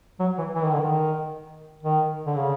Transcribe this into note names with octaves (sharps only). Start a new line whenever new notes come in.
F#3
E3
E3
D#3
D3
D#3
D#3
D3
C#3